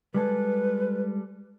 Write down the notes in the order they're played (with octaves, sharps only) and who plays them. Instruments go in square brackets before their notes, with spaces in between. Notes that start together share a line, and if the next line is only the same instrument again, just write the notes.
[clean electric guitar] G3 G#3 A4 [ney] B4